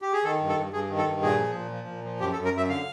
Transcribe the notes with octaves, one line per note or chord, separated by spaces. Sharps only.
G4
G#4
D#3 A4
G2
A4
G2
G2 G#4
D#3
A4
G2
A#2 G#4
F3
A#2
F3
A#2
F3
F#2 G4
A4
F#2
A#4
F#2 E5
D3 F5